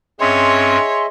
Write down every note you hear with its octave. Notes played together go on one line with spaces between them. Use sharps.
G2 C4 C#4 G#4 C#5 D#5 E5 C6